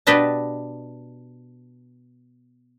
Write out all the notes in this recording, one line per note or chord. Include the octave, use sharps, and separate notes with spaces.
B2 D4 G4 B4 D#5 A5